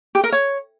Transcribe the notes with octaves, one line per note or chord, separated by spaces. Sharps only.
G4
A#4
C#5